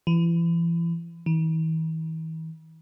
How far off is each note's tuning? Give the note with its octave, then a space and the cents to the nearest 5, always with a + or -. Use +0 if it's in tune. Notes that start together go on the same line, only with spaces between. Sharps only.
E3 +35
E3 -45